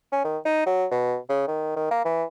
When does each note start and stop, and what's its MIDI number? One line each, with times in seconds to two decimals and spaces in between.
0.13 0.24 61
0.25 0.38 51
0.45 0.63 63
0.66 0.86 54
0.91 1.17 47
1.29 1.44 49
1.48 1.73 51
1.76 1.90 51
1.91 2.04 58
2.05 2.24 52